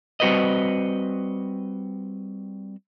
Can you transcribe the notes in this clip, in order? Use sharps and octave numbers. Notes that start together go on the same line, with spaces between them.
G3 C4 F#4 B4 C5 D#5